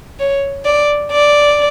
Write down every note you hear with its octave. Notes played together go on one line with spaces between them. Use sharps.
C#5
D5
D5